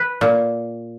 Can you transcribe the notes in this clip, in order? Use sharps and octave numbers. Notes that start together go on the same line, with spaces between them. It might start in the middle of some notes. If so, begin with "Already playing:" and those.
Already playing: B4
A#2